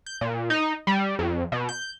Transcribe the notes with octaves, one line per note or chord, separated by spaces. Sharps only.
G6
A#2
D#4
G3
F2
B2
G6